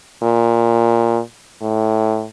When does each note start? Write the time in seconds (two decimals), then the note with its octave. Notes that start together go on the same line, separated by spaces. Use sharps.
0.23 A#2
1.62 A2